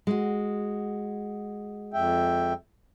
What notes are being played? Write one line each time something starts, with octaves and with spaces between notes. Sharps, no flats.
G#3 F#4
F2 E5 G5